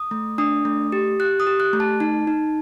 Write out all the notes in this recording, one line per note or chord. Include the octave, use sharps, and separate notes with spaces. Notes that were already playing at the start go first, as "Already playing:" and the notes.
Already playing: D#6
A3
D4 D#6
A3
G4
G4 F#6
D#6
G4
F#6
A3
A5
D#4 A5
D#4